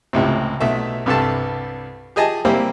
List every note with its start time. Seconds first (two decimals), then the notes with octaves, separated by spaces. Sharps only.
0.13 C#2 A2 C3
0.60 B1 A3 E5
1.06 C2 G2 G4 A4 A5
2.16 G4 G#4 D#5 G#5 A5
2.45 G3 A#3 C4 E4 G4